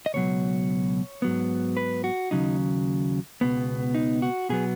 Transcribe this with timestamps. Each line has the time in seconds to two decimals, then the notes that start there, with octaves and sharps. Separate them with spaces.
0.06 D#5
0.14 C#2 B2 F#3 C#5
1.22 G#2 F#3 B3
1.77 B4
2.04 F#4
2.31 D#2 C#3 F#3 D#4
3.41 C#2 B2 B3
3.94 D#4
4.22 F#4
4.49 B2 F#3 B3 G#4